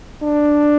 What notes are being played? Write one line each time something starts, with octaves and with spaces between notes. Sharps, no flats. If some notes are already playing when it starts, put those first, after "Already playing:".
D4